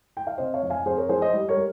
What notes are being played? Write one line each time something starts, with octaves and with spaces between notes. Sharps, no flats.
G5
F5
C3 C5 D#5
C#5 F5
F2
F5 G#5
F2 G#4 C5
A#4 C#5
F3 G#4 C5
C5 D#5
G3
A#4 C#5
G3